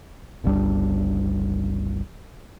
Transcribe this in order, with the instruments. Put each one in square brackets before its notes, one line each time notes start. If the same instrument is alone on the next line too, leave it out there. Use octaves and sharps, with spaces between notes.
[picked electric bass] G1 C#2 G3 D4